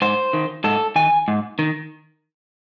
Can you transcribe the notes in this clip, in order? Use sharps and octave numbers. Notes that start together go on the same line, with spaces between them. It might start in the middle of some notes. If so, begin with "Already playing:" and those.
G#2 C5
D#3
G#2 A4
D#3 G#5
G#2
D#3